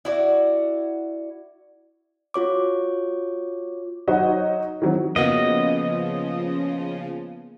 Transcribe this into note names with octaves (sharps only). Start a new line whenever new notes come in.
E4 F#4 D5
F4 F#4 C#5 D6
F#3 D#4 F#4 C5 C#5 D#5
D#3 E3 F#3 C4
C#3 F3 A#3 B3 F#4 D#5